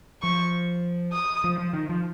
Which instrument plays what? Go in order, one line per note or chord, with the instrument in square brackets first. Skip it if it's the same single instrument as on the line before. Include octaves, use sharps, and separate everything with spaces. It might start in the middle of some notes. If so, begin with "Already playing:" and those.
[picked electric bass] F3 [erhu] C#6
[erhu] D#6
[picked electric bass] F3
F3
D#3
F3